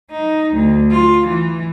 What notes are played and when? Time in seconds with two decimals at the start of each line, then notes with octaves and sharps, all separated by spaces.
0.11 D#4
0.54 D2
0.90 F4
1.28 E3